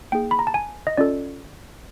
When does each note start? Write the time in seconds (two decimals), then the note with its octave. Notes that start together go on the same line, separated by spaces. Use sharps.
0.12 A#3 D#4 G#4 G5
0.31 B5
0.39 A#5
0.47 A5
0.54 G#5
0.87 D#5
0.97 C#4 F4 A4 D5